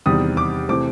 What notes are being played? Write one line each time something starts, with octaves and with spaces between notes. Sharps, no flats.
E2 C3 D#3 G3 D#6
D6
C3 E3 A3 C4 D6